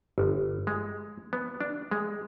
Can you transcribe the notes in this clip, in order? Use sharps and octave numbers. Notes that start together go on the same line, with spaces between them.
G1
G#3
B3
D4
G#3